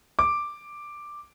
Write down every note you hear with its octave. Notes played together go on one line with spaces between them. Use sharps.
D6